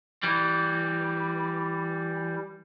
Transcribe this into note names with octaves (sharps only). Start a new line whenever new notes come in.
E3 G3